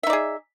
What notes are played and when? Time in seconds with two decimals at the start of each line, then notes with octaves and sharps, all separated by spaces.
0.03 E5
0.07 D#4
0.10 D5
0.13 G#4